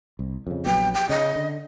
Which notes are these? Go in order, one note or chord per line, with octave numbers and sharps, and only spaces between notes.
C2
F2 C#3
A#1 F#3 B3 G5
G5
C#3 D#5
D3